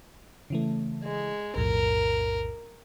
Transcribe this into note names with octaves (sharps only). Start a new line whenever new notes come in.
C#3 E3 A3
G#3
B1 F2 A2 A#4